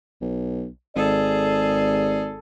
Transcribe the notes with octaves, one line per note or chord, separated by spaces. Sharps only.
B1
G#1 G#4 A4 D5